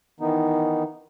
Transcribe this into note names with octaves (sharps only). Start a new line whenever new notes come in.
D#3 E3 B3 D#4